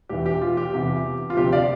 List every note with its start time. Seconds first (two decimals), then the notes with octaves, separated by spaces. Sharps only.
0.09 E1 E2 E3 G4
0.26 G4
0.41 F4
0.57 G4
0.73 E2 C3 E3
1.30 F4
1.37 D2 C3 F3 G4
1.52 D5 F5